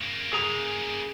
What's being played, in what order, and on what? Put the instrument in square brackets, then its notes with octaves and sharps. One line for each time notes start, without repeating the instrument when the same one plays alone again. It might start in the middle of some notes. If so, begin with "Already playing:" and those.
[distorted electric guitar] C#3 A#3
[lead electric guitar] G#4 A#5